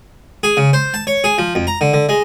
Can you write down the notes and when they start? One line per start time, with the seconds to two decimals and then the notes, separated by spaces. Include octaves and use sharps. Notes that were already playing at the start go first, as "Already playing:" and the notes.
0.43 G#4
0.57 C#3
0.73 C5
0.94 A5
1.07 C#5
1.24 G#4
1.38 F3
1.55 F2
1.67 A#5
1.81 D3
1.93 D3
2.09 G#3